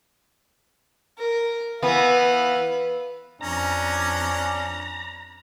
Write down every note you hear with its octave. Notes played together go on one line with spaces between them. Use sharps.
A#4
E3 B3 B4 F5
F2 C#4 D4 A#5